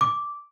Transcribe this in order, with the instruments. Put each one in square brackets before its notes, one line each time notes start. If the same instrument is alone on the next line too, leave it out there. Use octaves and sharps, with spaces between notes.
[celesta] D6